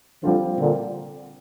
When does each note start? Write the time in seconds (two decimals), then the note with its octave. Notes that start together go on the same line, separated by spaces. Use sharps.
0.23 D3 F3 G3 C4 F4
0.59 A#2 D3